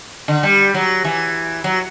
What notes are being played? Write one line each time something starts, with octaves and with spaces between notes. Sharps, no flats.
D3
G3
F#3
E3
F#3